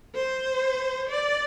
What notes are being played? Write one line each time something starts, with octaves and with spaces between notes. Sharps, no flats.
C5
D5